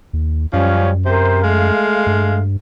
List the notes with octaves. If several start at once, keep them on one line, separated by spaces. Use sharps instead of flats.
D#2
F#2 F3 G3 C#4
C3 A#4 C5
G#3 A3 F5
G2